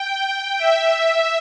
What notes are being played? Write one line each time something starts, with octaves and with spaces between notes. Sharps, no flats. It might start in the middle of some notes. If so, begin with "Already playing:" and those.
Already playing: G5
E5